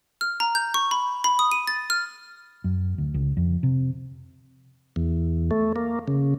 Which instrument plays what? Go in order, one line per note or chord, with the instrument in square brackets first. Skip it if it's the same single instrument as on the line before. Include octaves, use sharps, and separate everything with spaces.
[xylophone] F6
A#5
G6
C#6
B5
B5
D#6
D#7
A6
F6
[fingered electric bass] F#2
D2
C#2
F2
C3
[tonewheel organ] E2
A3
A#3
C#3